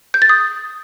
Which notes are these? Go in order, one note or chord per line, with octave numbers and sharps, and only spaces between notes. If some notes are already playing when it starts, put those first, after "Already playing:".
G6
A6
D#6